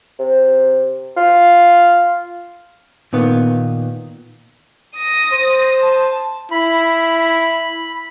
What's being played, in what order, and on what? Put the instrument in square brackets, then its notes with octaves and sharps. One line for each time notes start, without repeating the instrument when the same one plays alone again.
[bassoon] C3
F4
[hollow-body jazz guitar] A#2 D#3 B3
[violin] D#6 A#6
[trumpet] C5
[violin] A5
[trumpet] E4 [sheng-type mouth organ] B5